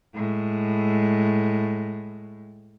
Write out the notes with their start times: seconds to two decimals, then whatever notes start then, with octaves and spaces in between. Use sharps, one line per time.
0.15 A2 G#3